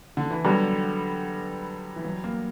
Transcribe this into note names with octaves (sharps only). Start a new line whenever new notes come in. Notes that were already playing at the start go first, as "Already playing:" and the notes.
D3
E3
D3 F#3 G3 B3
E3
F#3
A#3